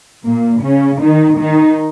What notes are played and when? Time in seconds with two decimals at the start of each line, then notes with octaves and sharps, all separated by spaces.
0.24 A#2 A#3
0.62 C#3 C#4
1.01 D#3 D#4
1.40 D#3 D#4